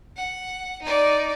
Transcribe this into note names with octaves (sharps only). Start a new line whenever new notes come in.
F#5
D#4 D5